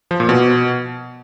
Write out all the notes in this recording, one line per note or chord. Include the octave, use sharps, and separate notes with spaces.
F3
A#2
B2